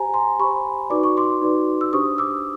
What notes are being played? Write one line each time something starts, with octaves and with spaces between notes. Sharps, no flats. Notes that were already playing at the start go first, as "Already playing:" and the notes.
Already playing: G4 C5 G#5 A#5
A#5 C6
G4 C5 B5 C#6
D#4 F#4 B4 D5 D6
C#6
C6 D6
D#4 F#4 B4 D5
E6
D4 G4 C5 C#6 D#6
D6 E6